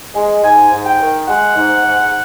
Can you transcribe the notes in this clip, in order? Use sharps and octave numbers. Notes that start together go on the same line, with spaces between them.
G#3
G#2 G#5
G#2
G5
D#3
G#3 F#5
G#2
G#2